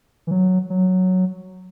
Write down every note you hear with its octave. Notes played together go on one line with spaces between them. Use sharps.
E3
F#3
F#3